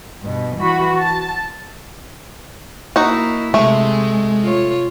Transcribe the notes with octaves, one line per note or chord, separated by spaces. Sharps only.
G2 B2
E3 F#4 B5
A5
A#3 D#4 E4 F#4
C3 G#3 A3
F4 C#5